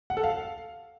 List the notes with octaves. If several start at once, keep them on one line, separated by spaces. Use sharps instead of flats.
F#5
A4
F5